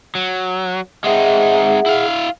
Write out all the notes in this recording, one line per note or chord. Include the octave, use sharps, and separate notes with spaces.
F#3
G#3 C4 D#4 G#4 E5 F#5
E4 F5